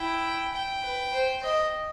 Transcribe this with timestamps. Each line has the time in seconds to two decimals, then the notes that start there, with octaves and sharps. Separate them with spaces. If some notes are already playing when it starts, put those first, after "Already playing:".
Already playing: E4 G5
0.53 G5
0.82 B4
1.13 C5
1.43 D#5